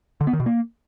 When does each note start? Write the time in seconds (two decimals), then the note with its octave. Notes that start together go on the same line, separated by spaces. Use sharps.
0.21 D3
0.27 B3
0.33 D#3
0.40 B2
0.46 A#3